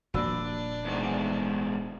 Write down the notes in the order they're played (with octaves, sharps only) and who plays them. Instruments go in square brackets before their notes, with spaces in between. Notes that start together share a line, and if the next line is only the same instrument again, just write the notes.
[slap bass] D#1 F3 A#3 [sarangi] D4 [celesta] F#4 B5 E6
[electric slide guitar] E2 G#2